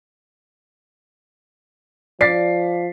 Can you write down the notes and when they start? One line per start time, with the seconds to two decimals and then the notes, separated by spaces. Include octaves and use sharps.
2.21 F3 D5 A6 B6 C7